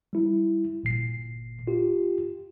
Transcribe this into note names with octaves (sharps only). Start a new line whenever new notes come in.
G3 E4
G1 A#2 C7
F4 G4